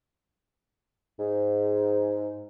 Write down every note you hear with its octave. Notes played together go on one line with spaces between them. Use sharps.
G#2